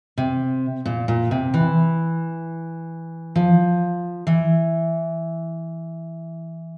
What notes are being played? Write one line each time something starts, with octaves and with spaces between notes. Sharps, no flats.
C3
A#2
A#2
C3
E3
F3
E3